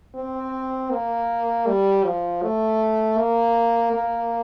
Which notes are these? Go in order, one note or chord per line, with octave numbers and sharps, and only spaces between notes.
C4
A#3
G3
F3
A3
A#3
A#3